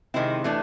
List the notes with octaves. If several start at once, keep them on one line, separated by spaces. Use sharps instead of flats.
C3 D#3 G#3 C4 E4
E3 A3 D4